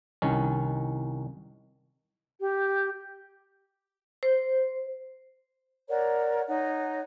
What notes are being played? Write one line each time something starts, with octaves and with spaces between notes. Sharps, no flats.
C2 D#3 C#4
G4
C5
A#4 C#5 D5 F#5
D#4 C#5 F#5